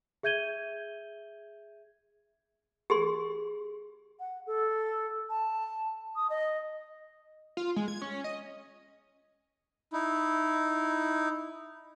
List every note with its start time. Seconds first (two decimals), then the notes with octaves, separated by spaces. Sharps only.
0.23 G#4 E5 G6 G#6 D#7 G7
2.90 G4 G#4 C6
4.20 F#5
4.47 A4
5.30 A5
6.16 D#6
6.30 D#5
7.57 F4
7.76 G#3
7.88 G#6
8.02 C#4
8.24 D#5
9.93 D#4 E4